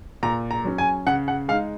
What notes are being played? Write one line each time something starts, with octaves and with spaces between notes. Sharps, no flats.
A#2 A#5
A#5
F#3 C#4
G#5
C#3 F#5
F#5
G#3 D#4 F5